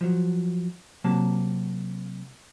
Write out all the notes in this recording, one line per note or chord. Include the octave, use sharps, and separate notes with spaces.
F3 F#3
C3 F#3 A#3 A5